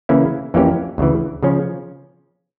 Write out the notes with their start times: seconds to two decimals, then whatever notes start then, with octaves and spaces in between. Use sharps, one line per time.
0.09 C#3 E3 A#3 C#4 E4
0.54 F2 E3 A#3 C#4 G4
0.98 D2 C#3 E3
1.43 C#3 F3 C#4